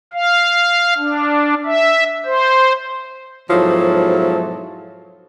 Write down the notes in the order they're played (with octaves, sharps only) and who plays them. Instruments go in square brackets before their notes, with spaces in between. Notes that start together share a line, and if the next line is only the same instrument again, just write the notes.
[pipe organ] F5
D4
E5
C5
[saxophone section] G#2 B2 F3 F#3 E4 A4